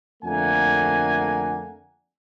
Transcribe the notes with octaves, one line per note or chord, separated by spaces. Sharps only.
F2 D3 A3 A#3 F#5 G#5